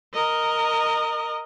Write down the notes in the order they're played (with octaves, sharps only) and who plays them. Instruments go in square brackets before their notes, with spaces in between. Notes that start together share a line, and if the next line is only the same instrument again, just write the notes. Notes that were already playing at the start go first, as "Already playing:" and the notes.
[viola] A#4 D#5